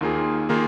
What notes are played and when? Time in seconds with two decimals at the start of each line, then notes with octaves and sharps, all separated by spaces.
0.01 D#2 D#3 A#3 F4 G#4
0.49 D#3 A#3 F4 G#4